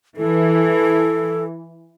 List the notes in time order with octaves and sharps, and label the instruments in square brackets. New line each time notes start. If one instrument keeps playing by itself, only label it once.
[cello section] E3 [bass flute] A4